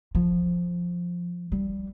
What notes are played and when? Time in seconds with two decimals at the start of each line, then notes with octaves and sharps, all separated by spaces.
0.15 F3
1.52 G3